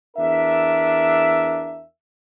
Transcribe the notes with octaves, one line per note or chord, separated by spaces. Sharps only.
E2 D4 A#4 E5